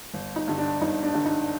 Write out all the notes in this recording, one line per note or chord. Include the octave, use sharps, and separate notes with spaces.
G1
D#4
G2 D3
D4
G1 D#4
D4
G2 D3
D#4